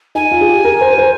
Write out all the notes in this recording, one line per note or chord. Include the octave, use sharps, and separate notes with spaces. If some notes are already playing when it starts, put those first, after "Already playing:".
D#4 G#5
F4
G#4
G4
A#4
C5
A#4
C5